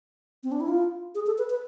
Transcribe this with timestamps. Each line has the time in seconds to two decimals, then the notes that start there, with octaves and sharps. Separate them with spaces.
0.44 C4
0.52 D4
0.61 E4
0.68 F4
1.15 G#4
1.26 A4
1.38 B4
1.50 B4